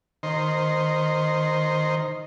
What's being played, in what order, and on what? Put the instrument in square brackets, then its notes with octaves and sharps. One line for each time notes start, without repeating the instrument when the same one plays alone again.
[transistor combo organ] D#3 C5